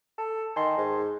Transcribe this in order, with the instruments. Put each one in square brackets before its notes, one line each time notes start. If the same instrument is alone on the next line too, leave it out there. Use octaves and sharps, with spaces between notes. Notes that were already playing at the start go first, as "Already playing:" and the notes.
[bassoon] A4
[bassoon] D#3 [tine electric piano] G#5 A5 C6
[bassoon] G#2